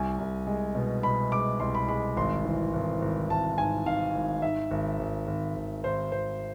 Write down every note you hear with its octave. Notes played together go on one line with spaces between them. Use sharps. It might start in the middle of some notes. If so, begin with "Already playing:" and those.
Already playing: C2 G#5
C2
G#3
B2
B2 B5
G#3 D6
C2 C6
B5
G#3 B5
G#1 C6
E3
G#1
G#1
G#1 A5
G#2 G#5
G#2 F5
G#1
G#2 E5
G#1
G#1
G#1
G#1
G#1 C5
G#1 C5